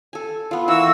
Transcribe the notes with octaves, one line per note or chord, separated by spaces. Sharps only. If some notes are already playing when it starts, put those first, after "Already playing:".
A4 G#5
B3 F4
E3 A3 A#3 F#4 E6